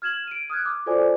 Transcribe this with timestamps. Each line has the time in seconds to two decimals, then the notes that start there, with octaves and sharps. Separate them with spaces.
0.02 F6 G#6 E7 F#7
0.27 D7 D#7
0.50 D#6 F6 F#6 G#6
0.66 D6
0.86 F4 F#4 A4 C5 D5 G#5